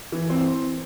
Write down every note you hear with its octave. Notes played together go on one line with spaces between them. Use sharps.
E3
C4